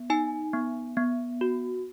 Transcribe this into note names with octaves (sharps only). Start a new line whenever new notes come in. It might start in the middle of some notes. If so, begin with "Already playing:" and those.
Already playing: B3
D#4 G#5
B3
B3
F#4